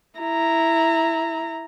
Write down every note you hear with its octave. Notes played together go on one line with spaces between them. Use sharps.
E4 A#5